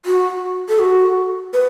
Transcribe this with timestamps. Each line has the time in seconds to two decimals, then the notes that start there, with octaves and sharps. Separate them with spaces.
0.06 F#4
0.69 A4
0.79 F#4
1.53 B4